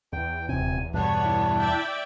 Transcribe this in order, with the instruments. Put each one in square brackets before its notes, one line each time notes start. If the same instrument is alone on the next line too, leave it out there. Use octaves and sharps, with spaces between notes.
[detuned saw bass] E2 [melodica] G5
[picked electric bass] D#1 C3 [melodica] G#5
[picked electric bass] E2 G2 B2 [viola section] G3 B3 C#5 [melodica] D4
[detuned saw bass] E4
[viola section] D5 E5 G5